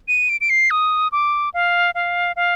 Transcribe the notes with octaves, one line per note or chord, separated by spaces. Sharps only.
D#7
D7
D7
C7
D#6
D6
F5
F5
F5